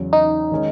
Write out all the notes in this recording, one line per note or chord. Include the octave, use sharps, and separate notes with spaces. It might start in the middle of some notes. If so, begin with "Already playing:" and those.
Already playing: E2 C#3 F#3
D#4
D#3 G#3 C#4